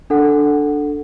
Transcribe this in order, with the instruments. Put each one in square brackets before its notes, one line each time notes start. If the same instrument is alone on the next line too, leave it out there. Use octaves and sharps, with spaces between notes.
[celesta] D4 A4 F#5